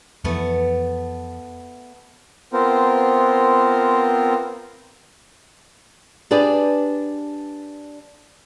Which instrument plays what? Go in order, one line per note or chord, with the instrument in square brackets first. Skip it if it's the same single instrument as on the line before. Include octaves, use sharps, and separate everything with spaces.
[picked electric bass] F2 E3 [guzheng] A3 B3
[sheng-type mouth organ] B3 C4 F4 A#4 C5
[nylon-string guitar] D4 G4 G#4 B4 D5